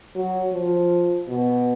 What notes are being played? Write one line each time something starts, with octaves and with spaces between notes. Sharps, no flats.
F#3
F3
B2